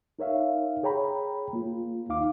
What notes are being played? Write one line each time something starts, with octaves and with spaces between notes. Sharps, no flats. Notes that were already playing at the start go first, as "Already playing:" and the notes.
D#4 A#4 C#5 E5 F5
G#4 C#5 G5 A#5 B5
A#3 F4
D#2 D#4 F5 D6